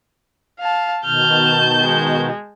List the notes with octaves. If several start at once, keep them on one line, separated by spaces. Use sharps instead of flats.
F5 A5
B2 D#3 A5 F6 G6
G#3